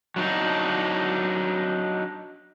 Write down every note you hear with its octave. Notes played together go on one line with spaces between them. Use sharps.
F#3 D4 D#4